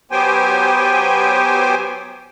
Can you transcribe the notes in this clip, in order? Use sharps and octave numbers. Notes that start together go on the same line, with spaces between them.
F#3 B3 G4 C5 G5 G#5